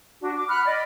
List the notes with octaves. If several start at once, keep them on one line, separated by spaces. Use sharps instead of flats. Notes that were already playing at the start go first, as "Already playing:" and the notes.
D4 F#4
D6
F#5 B5 F6 F#6
D5 D#5 B5